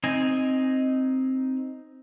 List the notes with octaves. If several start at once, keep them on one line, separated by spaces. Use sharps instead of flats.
C4 D#4 D#5 G#5